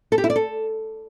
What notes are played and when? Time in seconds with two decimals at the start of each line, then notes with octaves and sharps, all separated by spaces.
0.12 A4
0.18 G4
0.24 E4
0.30 D5
0.36 A4